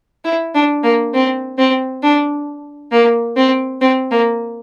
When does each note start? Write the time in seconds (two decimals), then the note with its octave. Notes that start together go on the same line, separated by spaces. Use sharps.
0.25 E4
0.55 D4
0.84 A#3
1.14 C4
1.58 C4
2.03 D4
2.92 A#3
3.37 C4
3.81 C4
4.11 A#3